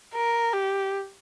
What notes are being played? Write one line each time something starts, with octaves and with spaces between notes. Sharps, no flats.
A#4
G4